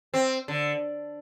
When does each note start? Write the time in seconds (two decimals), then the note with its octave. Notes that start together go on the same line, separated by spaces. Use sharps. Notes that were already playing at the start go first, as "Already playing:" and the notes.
0.14 C4
0.48 D3